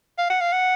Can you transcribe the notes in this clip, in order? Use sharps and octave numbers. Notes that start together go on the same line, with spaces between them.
F5
F#5
F5
F#5